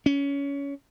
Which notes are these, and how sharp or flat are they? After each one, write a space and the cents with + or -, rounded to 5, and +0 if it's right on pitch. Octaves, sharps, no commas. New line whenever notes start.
C#4 +20